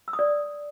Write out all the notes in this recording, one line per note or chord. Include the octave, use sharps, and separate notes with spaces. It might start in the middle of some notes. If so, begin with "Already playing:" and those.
E6
D#6
D5